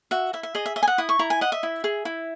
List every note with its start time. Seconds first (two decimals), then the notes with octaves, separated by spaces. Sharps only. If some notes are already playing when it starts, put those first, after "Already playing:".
0.11 F#4 E5
0.33 E4 E5
0.43 E5
0.55 G#4 D#5
0.66 E5
0.76 D#5 E5
0.83 G#5
0.88 F#5
0.98 E4 D#6
1.09 C#6
1.19 E4 A#5
1.30 G#5
1.41 D#5 F#5
1.52 E5
1.63 E4
1.84 G#4
2.05 E4